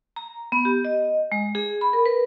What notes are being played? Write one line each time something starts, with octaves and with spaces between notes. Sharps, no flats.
A#5
B3
G4
D#5
G#3
G#4
B5
A#4
B4